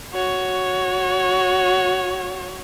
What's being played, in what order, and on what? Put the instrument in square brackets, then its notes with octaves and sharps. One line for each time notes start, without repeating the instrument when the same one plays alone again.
[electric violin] F#4 C#5